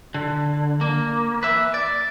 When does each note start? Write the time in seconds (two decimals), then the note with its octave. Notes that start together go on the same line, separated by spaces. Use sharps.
0.14 D3
0.81 A#3
1.43 B4 E5
1.74 D5